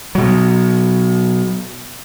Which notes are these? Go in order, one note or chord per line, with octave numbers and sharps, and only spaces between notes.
B2 F#3